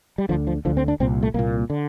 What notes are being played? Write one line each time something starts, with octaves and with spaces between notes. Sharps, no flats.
G3
D2 D3 F3
F3
D2 D3 F3
C4
D4
C2 A#2 C4
A3
C2 A#2 A#3
D3